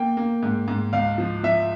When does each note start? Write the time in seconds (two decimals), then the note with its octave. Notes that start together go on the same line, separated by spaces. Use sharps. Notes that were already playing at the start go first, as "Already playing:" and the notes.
Already playing: A#3 G5
0.17 A#3
0.43 G#2
0.68 G#2
0.93 C#2 F5
1.18 F3
1.43 F3 E5